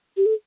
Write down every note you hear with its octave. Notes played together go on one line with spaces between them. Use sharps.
G4
A4